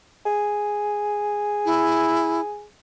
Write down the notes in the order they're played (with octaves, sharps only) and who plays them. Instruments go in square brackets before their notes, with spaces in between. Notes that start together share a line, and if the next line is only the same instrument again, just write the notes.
[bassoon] G#4
[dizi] E4